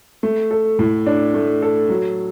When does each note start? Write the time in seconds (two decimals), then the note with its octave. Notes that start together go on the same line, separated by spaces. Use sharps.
0.23 A3
0.51 A4
0.79 A2
1.06 D4
1.34 A3
1.62 A4
1.89 F#3